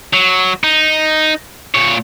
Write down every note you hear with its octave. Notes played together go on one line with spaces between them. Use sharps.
F#3
D#4
A#2 C#5